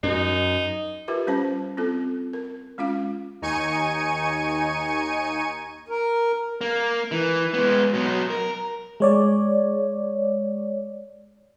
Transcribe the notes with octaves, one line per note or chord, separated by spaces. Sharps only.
F#2 D#4
F4 G4 A#4 B4 E5
G3 C#4 C5 A5
C4 F4 A4
A#4
G#3 C#4 F4 F5
D#2 D#4 G#5 C#6 C#7 D#7
A#4
A#3
E3
G#3 B3
B2 F#3
A#4
G#3 C#5 D5